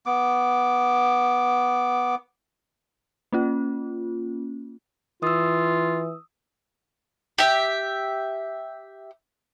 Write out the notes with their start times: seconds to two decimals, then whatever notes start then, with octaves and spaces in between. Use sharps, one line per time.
0.06 B3 D6
3.32 A#3 C#4 F4
5.23 E3 F4 D#6 E6
7.38 G4 E5